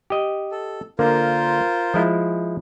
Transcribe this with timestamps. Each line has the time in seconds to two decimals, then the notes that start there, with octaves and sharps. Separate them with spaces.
0.10 G4 D#5
0.52 A4
0.99 D3 A#3 F4 A#4 C5
1.94 F3 G#3 E4